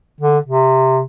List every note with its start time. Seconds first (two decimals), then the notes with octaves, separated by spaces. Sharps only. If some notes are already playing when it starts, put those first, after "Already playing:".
0.20 D3
0.46 C3